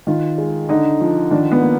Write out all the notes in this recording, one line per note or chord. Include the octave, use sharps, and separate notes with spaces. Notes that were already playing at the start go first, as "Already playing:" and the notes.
D#3 F4
G#3
D3 D#4
F3
D#3 D4
B3
A#3